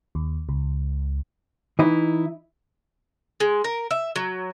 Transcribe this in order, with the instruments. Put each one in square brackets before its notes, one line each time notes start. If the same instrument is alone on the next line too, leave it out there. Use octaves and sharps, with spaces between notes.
[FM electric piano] D#2
C#2
[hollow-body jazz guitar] E3 D#4 E4
[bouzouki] G#3
A#4
E5
F#3